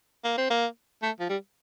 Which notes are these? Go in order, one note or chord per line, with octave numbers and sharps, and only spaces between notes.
A#3
C4
A#3
A3
F3
G3